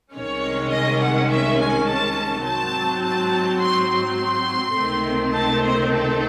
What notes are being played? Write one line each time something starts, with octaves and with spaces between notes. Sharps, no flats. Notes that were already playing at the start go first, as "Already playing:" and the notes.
C2 C3 D#3 G#3 C#4 C#5
D#5
F#5
E5
G#5
A5
G#2 F#3 C4 A5
A5
C6
C6
C#2 C3 D#3 A3 C4
A5
C5
A4